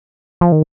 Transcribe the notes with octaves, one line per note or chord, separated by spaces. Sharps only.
F3
D#3